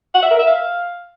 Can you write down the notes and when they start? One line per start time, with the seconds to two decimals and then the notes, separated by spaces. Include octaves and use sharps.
0.14 F#5
0.22 E5
0.31 A#4
0.39 E5
0.47 F5